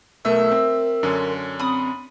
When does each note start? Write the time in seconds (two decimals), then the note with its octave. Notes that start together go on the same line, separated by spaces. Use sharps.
0.25 B1 B2 A3 A#4 E5
0.51 C4
1.03 F#2 D3 C#4
1.59 C4 B5 D#6